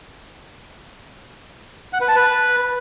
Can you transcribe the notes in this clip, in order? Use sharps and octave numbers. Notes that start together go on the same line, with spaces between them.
F#5
B4
A5
B4